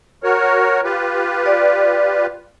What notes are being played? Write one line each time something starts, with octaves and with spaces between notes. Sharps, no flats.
F#4 A#4 C#5
F4 G4 B4
D5